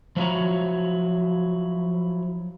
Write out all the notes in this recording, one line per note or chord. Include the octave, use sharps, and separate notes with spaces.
F3 F#3 E4 F#4 C#5 A#5